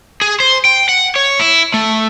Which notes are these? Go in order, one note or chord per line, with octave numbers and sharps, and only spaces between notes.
G#4
C5
G5
F#5
C#5
E4
A3